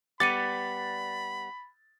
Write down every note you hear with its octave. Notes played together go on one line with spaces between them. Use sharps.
G3 B3 B5 D6 A6 C#7 D#7